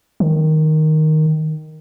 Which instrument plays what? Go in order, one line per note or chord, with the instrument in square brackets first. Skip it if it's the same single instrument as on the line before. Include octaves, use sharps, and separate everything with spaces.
[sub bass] D#3